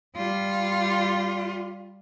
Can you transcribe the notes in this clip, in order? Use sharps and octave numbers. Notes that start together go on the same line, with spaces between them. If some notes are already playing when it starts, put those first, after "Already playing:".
G3 F4